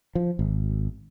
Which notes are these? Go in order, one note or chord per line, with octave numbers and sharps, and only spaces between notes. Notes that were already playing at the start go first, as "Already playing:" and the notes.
F3
G#1